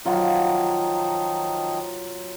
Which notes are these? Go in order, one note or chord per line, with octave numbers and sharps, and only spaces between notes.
D#3 F3 F#3 D#4 F4